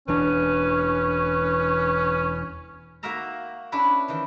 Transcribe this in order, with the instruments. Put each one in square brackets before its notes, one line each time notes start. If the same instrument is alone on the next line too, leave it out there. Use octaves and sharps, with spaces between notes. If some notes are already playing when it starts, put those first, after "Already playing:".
[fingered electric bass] E1 E2 D4 [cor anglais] C#4 [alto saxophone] B4
[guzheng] A#3 D#4 F#4 A#4 E5 A#5
C#4 D4 E4 B4 B5
D#3 E3